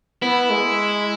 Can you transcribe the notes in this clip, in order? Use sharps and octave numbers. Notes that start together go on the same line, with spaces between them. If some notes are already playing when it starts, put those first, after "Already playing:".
B3 E4
G#3